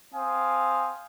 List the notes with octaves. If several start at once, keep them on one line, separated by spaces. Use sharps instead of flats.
C4 F5 G#5 D#6